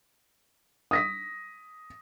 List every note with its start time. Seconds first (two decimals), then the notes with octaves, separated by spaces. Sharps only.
0.91 D#6 A#6 B6